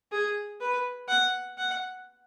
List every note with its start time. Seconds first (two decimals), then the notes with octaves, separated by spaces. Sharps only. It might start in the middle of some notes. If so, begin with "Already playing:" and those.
0.12 G#4
0.61 B4
1.08 F#5
1.58 F#5